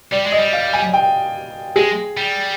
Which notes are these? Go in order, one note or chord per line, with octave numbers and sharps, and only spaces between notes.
G3 D5
G#3
D#5
G3
F5
G#5
G5
G#3 G#4
G3